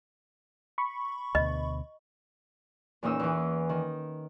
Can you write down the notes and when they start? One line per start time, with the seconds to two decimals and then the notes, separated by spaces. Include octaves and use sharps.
0.78 B5 C#6
1.35 D2 B2 D#5
3.03 E2 A#2 C#4 D#4 E6
3.19 E2 E3
3.69 D#3